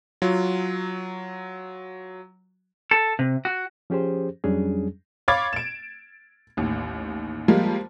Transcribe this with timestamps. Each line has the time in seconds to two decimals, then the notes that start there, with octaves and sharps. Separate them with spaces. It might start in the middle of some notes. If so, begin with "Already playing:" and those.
0.22 F#3 F4
2.91 A4
3.19 C3
3.45 F#4
3.90 F3 C#4 G4 G#4 C5
4.44 F2 F#3 G3 C#4 D4 G#4
5.28 C#5 F5 B5 D6 G#6 A6
5.53 D7 E7
6.57 A1 D#2
7.48 F3 G3 G#3 A#3